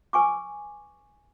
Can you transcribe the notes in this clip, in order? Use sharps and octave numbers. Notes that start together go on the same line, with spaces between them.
B4 G#5 C#6 D6